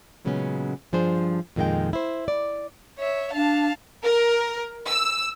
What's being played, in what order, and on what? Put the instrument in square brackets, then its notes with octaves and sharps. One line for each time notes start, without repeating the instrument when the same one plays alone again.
[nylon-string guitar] A#2 C#3 F#3 G#3 B3 C#4
G2 F3 D4 G#4 C5
F2 A#2 D#3 G#3 F5 G5
E4 C5
D5
[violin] C#5 E5
[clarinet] D4 [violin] F5 A5
[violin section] A#4
E6